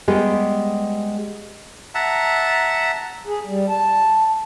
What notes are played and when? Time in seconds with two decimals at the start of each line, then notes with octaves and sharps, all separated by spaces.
0.08 G3 G#3 B3 G4
1.95 E5 F#5 A5 A#5
3.25 G#4
3.47 G3
3.69 A5